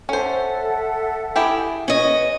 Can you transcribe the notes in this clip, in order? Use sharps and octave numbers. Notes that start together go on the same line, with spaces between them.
C#4 A4 C5 E5 F#5
E4 G4 G#4
C#4 B4 D#5